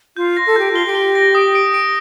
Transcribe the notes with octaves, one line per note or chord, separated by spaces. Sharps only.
F4 G6
A#6
A4
G4 G6
F4 G7
G4
G7
A#6
D#6
D7
D7